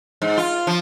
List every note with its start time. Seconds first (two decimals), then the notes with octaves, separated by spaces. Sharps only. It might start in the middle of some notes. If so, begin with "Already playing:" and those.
0.22 G#2
0.38 F4
0.67 F3